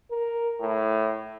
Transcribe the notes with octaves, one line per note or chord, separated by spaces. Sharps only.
A#4
A2